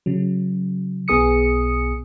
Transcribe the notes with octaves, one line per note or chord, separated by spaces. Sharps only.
C#3 F#3
B1 B2 B3 G#4 D#6 C#7